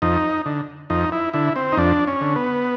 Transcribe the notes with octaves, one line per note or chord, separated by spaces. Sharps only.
F2 D#4
D3
F2 D#4
E4
D3 E4
C4
D#4
F2 D4
C#4
D3
B3